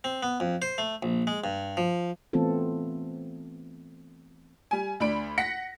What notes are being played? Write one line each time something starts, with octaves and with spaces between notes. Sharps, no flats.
C4
B3
F2
C5
A3
A#1
G#3
G2
F3
E3 A3 B3 C4 F4 A4
G3 G#5
D2 D4 B5 D7
F#5 A#6 B6 C#7